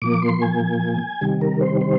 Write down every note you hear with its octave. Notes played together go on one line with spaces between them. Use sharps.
A#2 F3 A#3 D6
C6
G#5
C3 D#3 G3
A#4
C5
C5